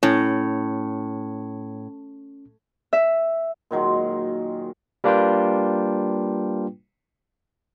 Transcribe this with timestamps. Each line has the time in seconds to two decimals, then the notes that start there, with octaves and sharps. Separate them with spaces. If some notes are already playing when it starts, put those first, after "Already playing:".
0.03 A2 C#4
2.93 E5
3.71 A#2 D#3 F#3 G#3
5.04 G3 A#3 D4 F4 B4 G5